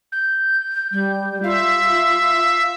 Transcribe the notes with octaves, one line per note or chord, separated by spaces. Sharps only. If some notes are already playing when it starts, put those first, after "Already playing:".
G6
G3 G6
F4 E5 F5